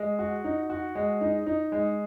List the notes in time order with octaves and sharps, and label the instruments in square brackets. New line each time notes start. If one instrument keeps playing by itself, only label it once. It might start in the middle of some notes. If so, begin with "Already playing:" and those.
Already playing: [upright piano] G#3
F#4
D#4
F#4
G#3
D#4
D#4
G#3